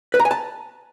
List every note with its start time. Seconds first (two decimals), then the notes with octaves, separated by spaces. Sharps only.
0.14 B4
0.19 A#5
0.25 G#5
0.31 A5